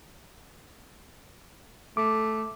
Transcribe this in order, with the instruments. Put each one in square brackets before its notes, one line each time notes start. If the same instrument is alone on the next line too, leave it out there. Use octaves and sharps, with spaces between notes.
[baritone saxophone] A3 [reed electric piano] D6